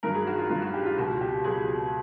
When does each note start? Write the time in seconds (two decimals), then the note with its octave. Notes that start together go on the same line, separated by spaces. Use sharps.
0.03 G2 D#3 F#3 A#4
0.14 G#4
0.27 F#4
0.38 F4
0.50 G2 D#3 F#3 F4
0.62 F#4
0.74 G4
0.86 F4
0.97 C#2 B2 F#3 F#4
1.21 G4
1.44 C#2 B2 F#3 G#4